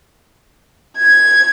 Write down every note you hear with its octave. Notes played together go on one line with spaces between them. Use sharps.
G#6